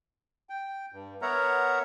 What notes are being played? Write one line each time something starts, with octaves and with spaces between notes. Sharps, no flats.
G5
G2
B3 A#4 C#5 E5 F#5 A#5